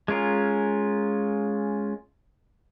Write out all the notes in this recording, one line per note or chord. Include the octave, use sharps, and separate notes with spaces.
G#3 C#4 F4 A#4